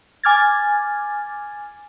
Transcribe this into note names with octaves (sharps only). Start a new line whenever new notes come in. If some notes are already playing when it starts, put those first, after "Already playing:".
G#5 D6 F6 G#6 A6